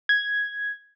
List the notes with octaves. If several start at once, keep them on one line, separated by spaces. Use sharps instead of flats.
G#6